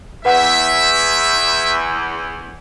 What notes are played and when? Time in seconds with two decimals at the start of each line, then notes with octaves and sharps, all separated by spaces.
0.25 E2 B4 E5 F#5